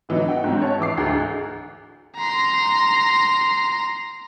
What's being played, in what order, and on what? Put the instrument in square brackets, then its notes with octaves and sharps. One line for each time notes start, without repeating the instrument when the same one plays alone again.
[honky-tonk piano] D3 E3 F#3 B3 D#4
F#5 G5
G#2 F#3 C4
C#5 A5
E3 E4 D6 C7
D2 G#2 G#3
[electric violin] A#5 C6